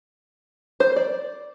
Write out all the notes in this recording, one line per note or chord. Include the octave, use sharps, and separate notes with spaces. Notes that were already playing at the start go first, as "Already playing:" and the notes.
C5
D5